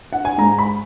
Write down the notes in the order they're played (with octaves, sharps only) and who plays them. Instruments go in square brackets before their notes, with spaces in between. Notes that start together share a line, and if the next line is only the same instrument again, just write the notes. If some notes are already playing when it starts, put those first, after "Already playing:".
[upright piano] F#5
G#5
G#2 A#5
B5